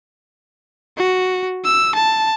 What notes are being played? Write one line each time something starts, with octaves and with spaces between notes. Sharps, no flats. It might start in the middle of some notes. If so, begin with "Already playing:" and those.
F#4
E6
A5